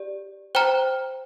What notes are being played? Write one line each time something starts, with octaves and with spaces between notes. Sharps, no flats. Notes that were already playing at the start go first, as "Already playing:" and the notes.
Already playing: G4 D5
C5 G5 A#5 F6